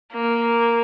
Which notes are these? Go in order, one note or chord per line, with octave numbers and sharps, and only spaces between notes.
A#3